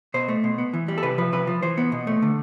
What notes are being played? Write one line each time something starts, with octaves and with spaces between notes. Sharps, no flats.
B2 C5
A3
B2
B3
E3
G3
A4
C3 B4
F3 B4
C3 B4
F3
E3 C5
B3
B2
A3
D3